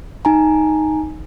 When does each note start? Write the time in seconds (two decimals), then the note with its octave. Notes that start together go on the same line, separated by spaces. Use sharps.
0.25 D#4 G#5 A#5